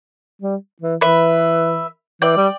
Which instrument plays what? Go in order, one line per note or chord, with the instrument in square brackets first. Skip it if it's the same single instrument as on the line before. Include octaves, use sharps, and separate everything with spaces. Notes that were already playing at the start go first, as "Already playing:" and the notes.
[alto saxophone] G3
E3
[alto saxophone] E3 [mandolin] B4 E5
[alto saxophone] E3 [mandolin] D5 G5
[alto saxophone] G3